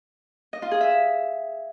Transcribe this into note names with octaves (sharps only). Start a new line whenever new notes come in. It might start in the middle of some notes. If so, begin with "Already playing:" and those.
D#5
F4
G#4
E5